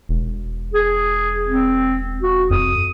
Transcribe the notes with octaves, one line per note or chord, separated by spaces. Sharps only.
E1
G#4
C4
F#4
F2 D#6